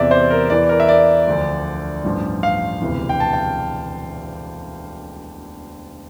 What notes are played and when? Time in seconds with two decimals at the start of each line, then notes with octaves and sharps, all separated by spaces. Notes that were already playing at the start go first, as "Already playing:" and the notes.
Already playing: E2 C3 E3 D5 E5
0.11 C5
0.30 A#4
0.50 E2 E3 D5
0.69 A#4
0.80 E5
0.89 D5
1.27 D2 D3 F3
2.04 A1 G2 F3
2.43 F5
2.82 E1 D2 C3 E3
3.09 G5
3.20 A5
3.33 G5